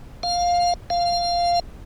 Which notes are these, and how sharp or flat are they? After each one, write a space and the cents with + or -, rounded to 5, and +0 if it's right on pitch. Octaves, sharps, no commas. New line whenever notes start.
F5 +10
F5 -5